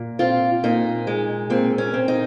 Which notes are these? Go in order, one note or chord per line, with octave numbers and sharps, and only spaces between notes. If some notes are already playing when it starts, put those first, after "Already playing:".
Already playing: A#2
C4 F4
A#2 D#4
G#3
A#2 C4
C#4
C4
D#4